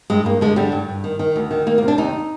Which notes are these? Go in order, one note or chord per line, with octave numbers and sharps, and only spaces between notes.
G2 G#3
G2 A#3
D3 G#3
D3 G3
G2
G2
D#3
D#3
D2
D#3
D2 A#3
A#3
C3
D4
D#2 D#4